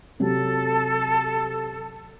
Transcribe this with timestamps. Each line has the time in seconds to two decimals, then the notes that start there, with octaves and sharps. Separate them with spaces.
0.20 C3 F#3 G4 A4